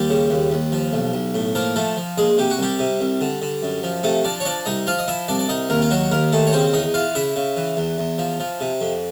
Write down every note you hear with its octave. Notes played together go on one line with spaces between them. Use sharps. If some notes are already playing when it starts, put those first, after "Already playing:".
Already playing: D#2 G3 G4
C#3
D#2
D#2
F3
B1
B1
A2
F3 A#3 A#4
F3 A3 A4
F3
A#1 G#3 G#4
C3 G4
F#4
C2 G3 G4
C3
C2
D3
D3
F#2
F3
C3 A3 A4
F3 D4 D5
C#5
F3 D4 D5
C2 D#4 D#5
F3 F4 F5
D#5
F3 E4 E5
C2 D4 D5
D5
C2 D#4 D#5
D#2 A#3 A#4
F4
D#3 F#3 F#4
D#2 A#3 A#4
D#3 A3 A4
C#5
C#3 C4 C5
E2 D#4 D#5
E3 F4 F5
C#3 E4 E5
C#3
E3
E2
E2
F3
F3
C3
F2